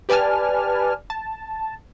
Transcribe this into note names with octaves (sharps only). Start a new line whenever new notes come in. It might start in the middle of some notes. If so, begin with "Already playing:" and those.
G4 B4 D5 G#5 A5 F6
A5